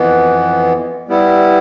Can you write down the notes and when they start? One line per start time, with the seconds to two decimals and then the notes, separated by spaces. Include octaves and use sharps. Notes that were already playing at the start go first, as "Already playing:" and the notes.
Already playing: F2 E3 B3
1.08 G3 B3 E4